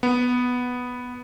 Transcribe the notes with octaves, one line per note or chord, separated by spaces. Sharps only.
B3